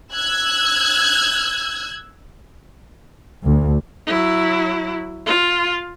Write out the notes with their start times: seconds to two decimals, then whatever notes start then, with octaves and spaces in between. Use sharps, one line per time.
0.14 E6 F#6 G#6
3.42 D2
4.07 F#3 E4
5.26 F4